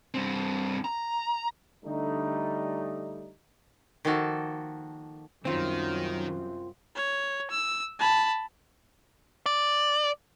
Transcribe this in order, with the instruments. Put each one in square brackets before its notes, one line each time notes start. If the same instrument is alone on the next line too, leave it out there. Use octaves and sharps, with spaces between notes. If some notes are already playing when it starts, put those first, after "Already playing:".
[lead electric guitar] G2 C4
A#5
[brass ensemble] D3 G3 A3 D#4
[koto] D#3 F3 A#3 F#4 A4
[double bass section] C2 F#2 [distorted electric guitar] D#3 [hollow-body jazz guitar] C4 F4
[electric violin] C#5
E6
A5 B5
[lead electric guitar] D5